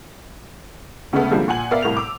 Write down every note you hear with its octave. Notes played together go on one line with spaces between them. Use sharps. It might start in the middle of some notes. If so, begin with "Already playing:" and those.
D2 C#3 G#3 A3 B3
C2 D3 F3 G3 G#3 A#3
A#2 F#5 G#5 F#7
B3 A#4 D5 E5 F5
C2 A2 A#4 F7
D6 E6